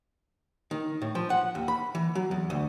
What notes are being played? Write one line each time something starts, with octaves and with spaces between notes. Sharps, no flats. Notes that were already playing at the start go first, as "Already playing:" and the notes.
D#3
A2
F3
F#5
D#2
B5
E3
F#3
E2
D2